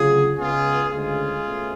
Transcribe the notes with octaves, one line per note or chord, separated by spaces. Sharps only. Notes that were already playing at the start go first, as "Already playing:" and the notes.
Already playing: D2 C#3 F#3 F4 G#4
C#2 C#3 G#3 B3 F4 G#4
D2 C#3 G#3 C#4 F4 G#4
B2 A3 C#4